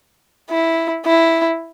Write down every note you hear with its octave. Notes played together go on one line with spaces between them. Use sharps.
E4
E4